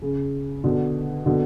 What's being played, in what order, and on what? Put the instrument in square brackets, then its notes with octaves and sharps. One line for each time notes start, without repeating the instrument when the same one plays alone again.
[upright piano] C#3
B2 D3
B2 D3